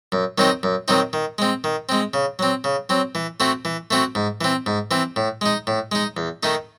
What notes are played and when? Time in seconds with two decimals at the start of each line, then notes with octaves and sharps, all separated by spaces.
0.12 F#2
0.38 D#3 F#3 C4 D#4
0.63 F#2
0.88 D#3 F#3 C4 D#4
1.13 D#3
1.38 G#3 C4
1.64 D#3
1.89 G#3 C4
2.14 C#3
2.39 F#3 C4
2.64 C#3
2.89 F#3 C4
3.15 E3
3.40 A3 C4 F#4
3.65 E3
3.91 A3 C4 F#4
4.15 G#2
4.41 E3 C4
4.66 G#2
4.91 E3 C4
5.16 A2
5.41 G#3 D#4
5.67 A2
5.92 G#3 D#4
6.17 E2
6.43 D#3 A3 D#4